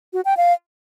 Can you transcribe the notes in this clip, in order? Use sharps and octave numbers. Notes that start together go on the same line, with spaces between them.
F#4
G5
F5